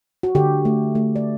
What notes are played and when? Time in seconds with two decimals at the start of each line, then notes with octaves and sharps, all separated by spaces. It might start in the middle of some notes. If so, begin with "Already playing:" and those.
0.23 F#4
0.35 D3 G4
0.65 A3
0.95 A3
1.16 D5